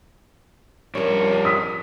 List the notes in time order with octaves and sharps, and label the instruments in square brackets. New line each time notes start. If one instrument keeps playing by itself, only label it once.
[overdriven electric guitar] F2 C#5 [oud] G3 C#4 [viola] A#4
[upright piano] D#6 B6